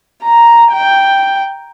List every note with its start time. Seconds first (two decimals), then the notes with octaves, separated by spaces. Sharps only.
0.23 A#5
0.72 G5